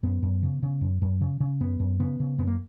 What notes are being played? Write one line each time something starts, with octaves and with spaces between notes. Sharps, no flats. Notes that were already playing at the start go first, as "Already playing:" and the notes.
F#2 B3
F#2
C#3
C#3
F#2
F#2
C#3
C#3
F#2 B3
F#2
C#3 B3
C#3
F#2 B3
A#3